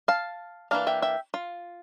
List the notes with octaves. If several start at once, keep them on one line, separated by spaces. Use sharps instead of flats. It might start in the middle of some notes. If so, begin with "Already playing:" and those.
F5 A5
E3 A#3 D4 F5 A5
E5 G5
E5 G5
F4